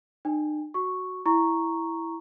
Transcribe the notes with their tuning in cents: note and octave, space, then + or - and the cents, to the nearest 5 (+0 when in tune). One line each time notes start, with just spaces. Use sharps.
D#4 -45 G5 +40
F#4 +0 C#6 +0
E4 +5 A#5 +0 C#6 +0